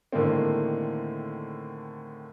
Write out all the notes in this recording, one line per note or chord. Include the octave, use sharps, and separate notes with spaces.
A2 D3 D#3 G#3 A#3 C4